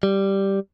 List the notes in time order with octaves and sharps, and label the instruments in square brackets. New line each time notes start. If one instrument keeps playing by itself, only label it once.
[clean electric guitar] G3